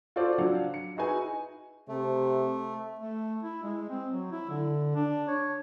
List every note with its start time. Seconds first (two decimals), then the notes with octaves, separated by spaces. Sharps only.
0.16 F4 F#4 A4 C5 D5
0.38 F#3 D4 F4 F5 F#5
0.74 C#7
0.97 D#4 E4 F#4 G#4 B4 G#5
1.88 C3 A3
2.99 A3
3.43 E4
3.63 G#3
3.90 C4
4.12 F#3
4.32 E4
4.50 D3
4.96 D4
5.28 C#5